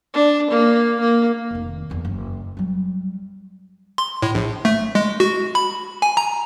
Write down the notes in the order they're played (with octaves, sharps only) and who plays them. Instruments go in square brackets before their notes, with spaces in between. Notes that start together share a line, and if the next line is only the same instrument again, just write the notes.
[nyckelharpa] D4
A#3
A#3
[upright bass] F1 D#3
F#1 E2
F#1
F#3 G3
[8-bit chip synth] C6
A2
A#1
A3
G#3
F#4
B5
G#5
A#5